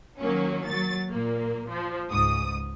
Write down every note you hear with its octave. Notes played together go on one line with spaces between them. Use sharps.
D#3 F#3 A#3 C#4
F#3 A6
A#2 A#3
F3
C#2 G#2 D#6